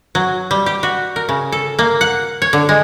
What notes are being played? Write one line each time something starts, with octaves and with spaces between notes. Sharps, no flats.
F#3
G3
G4
F#4
A#4
C#3
A4
A#3
F#5
C#5
D3
G#3